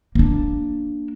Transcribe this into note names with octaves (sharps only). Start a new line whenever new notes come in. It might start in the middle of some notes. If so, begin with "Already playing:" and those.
A#3 D4